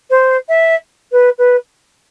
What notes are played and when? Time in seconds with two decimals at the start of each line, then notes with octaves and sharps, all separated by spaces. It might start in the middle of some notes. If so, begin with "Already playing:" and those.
0.10 C5
0.49 E5
1.12 B4
1.38 B4